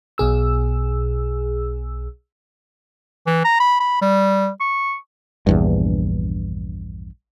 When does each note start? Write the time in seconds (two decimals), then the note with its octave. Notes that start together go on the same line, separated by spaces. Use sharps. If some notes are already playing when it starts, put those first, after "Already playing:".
0.18 B1 B2 G#4 E6
3.27 E3
3.45 A#5
3.60 B5
3.80 B5
4.01 G3
4.60 C#6
5.47 A#1 E2 G2